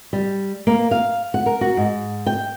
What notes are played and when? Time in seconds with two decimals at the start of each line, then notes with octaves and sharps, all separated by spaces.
0.13 G3
0.67 A#3
0.91 F5
1.34 F#5
1.46 A#4
1.61 F#4
1.77 G#2
2.26 G5